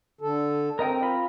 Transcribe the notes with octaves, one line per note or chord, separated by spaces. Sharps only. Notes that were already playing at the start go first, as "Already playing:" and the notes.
D3 A4
C4 A#4 D#5 G5
F4 A#5 B5